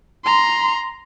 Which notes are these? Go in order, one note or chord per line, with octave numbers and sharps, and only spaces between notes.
A#5 C6